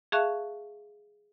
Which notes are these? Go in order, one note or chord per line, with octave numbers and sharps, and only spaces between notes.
G#4 E5 F5 A5 C#6 F#6